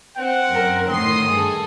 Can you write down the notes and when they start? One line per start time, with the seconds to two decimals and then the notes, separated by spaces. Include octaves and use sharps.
0.17 C4 F#5
0.50 F#2 A#4
0.89 A2 D#3 C6 D#6 C7
1.29 G2 G#4 A4